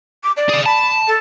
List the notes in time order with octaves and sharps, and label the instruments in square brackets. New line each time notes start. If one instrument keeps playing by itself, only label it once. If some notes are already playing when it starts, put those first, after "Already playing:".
[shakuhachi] D6
D5
[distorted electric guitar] G#4 F5
[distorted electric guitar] A5 [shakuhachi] B5
[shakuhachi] A4